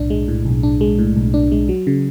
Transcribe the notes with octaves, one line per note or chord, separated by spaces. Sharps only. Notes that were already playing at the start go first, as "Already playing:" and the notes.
Already playing: B1 A2 D4
G#3
A2
B1
D4
G#3
A2
B1
D4
G#3
F#3
C#3